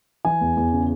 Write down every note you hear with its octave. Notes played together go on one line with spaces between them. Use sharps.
E3 G#5
E2
E2
C#3